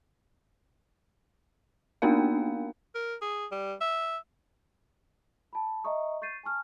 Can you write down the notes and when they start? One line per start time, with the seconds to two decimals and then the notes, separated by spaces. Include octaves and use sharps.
2.02 A#3 B3 D4 D#4 A#4 F5
2.95 A#4
3.22 G#4
3.51 G3
3.81 E5
5.53 A5 B5
5.84 D#5 E5 A#5 C#6 D#6
6.22 C#6 G6 A6 C7 D#7
6.43 G#5 A5 C#6 F6